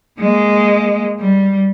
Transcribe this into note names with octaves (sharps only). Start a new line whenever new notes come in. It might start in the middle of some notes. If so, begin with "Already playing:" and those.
G#3 A#3
G3